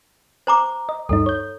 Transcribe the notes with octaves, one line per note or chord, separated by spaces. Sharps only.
C5 A#5 D6
D#5
D2 G2 D#4 A4
C#5 G6